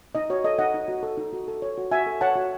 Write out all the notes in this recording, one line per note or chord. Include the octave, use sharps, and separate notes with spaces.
D#4 D#5
F#4 C#5
A4 D#5
D#4 D#5 F#5
D#4
F#4
A4
D#4
F#4
A4
C#5
F#4
F#4 E5 G#5
A4
C#5 F#5 A5
F#4